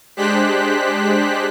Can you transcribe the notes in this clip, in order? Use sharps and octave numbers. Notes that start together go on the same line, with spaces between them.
G#3 D4 G4 C5 F#6 B6